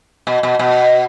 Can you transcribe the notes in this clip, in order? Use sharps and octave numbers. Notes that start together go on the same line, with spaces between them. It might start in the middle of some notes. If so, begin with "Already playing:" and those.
B2
B2
B2